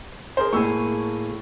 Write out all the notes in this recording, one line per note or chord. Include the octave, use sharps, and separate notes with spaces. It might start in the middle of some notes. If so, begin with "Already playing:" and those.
G#4 A#4 C5
A2 A#3 G#4 C#6 E6